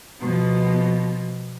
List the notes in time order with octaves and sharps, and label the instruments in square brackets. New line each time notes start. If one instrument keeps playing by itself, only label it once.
[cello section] B2 F3